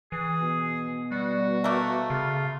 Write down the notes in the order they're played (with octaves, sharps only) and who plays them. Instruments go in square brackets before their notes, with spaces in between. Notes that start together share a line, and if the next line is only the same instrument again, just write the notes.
[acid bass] E3 [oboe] G#4
[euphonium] B2
[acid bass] G3 [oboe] F#4
[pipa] A3 A#3
[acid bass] C#3 [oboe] F4